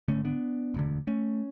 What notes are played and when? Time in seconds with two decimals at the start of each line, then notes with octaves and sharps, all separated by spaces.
0.08 G#1 F#2 D3 A3 C#4
0.25 B3 D4
0.74 E1 D2 D3
1.07 A3 C#4